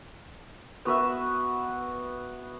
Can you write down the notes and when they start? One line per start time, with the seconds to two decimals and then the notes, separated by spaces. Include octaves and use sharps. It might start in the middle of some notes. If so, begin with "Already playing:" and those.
0.85 B3 F#4 B4 E5